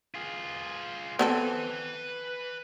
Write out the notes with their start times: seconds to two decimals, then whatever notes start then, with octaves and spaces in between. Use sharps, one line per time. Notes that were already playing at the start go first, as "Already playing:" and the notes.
0.15 F4 G#4
1.19 B3 C4 A4 B4 G#5